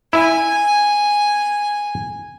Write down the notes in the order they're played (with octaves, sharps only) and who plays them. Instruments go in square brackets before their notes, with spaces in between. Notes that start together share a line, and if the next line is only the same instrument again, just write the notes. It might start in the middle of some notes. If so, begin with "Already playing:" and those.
[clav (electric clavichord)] E4 E5 [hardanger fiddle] G#5